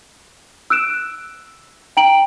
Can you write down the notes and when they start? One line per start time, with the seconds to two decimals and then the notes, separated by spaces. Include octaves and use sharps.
0.70 E6 F#6 D7 E7
1.97 G5 A#5 D7 F#7